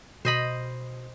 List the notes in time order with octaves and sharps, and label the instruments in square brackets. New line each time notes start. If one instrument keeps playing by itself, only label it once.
[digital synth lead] B2 [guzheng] C5 D#5 B5